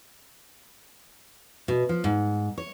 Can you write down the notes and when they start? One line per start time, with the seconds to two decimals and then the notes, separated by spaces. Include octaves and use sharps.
1.68 B2
1.89 F3
2.04 G#2
2.58 C#5